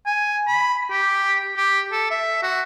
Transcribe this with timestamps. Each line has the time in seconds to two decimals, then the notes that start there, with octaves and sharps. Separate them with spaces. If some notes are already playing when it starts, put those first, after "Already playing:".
0.06 G#5
0.47 B5
0.90 G4
1.56 G4
1.92 A4
2.10 E5
2.43 F#4